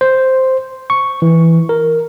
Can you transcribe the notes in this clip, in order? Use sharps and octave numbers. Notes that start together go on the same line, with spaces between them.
C5
C#6
E3
A#4